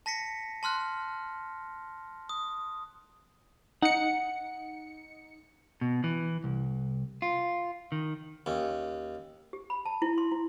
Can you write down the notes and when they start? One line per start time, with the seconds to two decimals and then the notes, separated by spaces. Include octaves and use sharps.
0.06 A5 A#6 B6 C#7
0.63 A5 C6 F6 F#6
2.29 D#6
3.82 D#4 F#5 C#7
5.81 B2
6.04 E3
6.44 C2
7.22 F4
7.92 D#3
8.46 D#2 C#4
9.53 G4
9.70 B5
9.86 A5
10.02 E4
10.18 C6
10.32 E4